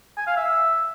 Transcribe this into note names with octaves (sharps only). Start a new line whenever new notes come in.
G#5
F5
E5